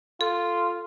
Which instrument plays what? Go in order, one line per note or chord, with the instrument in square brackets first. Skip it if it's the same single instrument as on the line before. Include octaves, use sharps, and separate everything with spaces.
[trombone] F4 [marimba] A4